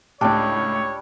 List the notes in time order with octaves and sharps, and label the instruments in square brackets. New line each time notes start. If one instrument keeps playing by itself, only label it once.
[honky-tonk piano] C#2 A2 [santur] G3 D4 G5 [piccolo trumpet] C#5